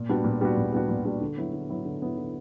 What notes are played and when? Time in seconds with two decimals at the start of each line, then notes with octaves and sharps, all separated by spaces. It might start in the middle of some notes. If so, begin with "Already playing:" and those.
Already playing: A#2
0.09 G3 B3 D4 F#4
0.24 A#2
0.41 G3 B3 D4 F#4
0.57 A#2
0.73 G3 B3 D4 F#4
0.89 A#2
1.05 G3 B3 D4 F#4
1.21 D3
1.37 F#3 B3 E4
1.53 D3
1.69 F#3 B3 E4
1.85 D3
2.01 F#3 B3 E4
2.17 D3